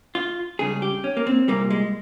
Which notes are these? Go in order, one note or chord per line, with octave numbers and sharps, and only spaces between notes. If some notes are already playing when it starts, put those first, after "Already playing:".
F4
C#2 C#3 G3 G#4
G4
C#4
A#3
C4
C2 A#2 G3 A#3
G#3